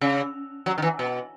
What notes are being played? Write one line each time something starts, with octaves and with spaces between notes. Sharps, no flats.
C#3
F#3
D#3
E3
B2